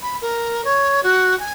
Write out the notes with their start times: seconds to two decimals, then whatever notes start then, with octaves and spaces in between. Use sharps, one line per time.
0.03 B5
0.22 A#4
0.64 C#5
1.03 F#4
1.39 G#5